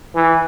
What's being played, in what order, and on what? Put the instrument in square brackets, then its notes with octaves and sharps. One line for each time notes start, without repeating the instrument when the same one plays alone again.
[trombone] E3